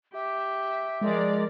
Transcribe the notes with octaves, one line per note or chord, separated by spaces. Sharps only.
G4 E5
F3 G#3 A#4 D5